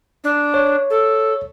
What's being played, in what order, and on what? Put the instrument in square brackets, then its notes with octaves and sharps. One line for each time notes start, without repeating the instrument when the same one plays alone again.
[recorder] D4
[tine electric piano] C#5
[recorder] A4